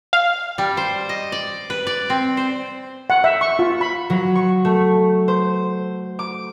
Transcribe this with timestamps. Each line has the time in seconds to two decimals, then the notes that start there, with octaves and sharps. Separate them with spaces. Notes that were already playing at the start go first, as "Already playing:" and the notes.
0.13 F5
0.58 G3
0.77 C5
1.09 D#5
1.32 D5
1.70 B4
1.87 D5
2.10 C4
2.37 C5
3.10 F#5
3.24 E5
3.41 C#6
3.59 F4
3.81 B5
4.10 F#3
4.35 C#6
4.65 A3
5.28 C5
6.19 D6